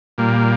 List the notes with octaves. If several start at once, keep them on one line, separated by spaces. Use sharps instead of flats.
A#2 G3 A#3